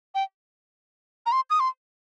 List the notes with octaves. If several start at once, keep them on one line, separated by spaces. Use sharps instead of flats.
G5
A#5
C6
D#6
C6